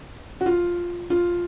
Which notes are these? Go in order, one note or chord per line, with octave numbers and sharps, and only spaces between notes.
F#4
F4
F4